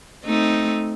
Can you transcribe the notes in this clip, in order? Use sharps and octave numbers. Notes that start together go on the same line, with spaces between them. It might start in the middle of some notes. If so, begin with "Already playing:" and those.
A3 C4 D#4